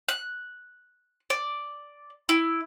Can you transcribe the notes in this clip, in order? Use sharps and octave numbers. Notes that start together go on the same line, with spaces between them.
F#6
D5
E4